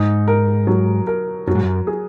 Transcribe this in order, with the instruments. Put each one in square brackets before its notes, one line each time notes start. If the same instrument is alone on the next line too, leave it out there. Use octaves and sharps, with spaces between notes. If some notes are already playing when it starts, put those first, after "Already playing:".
Already playing: [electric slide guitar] G#2 [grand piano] D#4
[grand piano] A#4
F#3
A#4
[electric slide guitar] F#2 [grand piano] F#3
[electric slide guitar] G#2
F#2
[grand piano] G#4